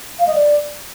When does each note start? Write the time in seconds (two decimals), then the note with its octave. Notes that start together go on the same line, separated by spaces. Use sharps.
0.19 F5
0.27 D#5
0.35 D5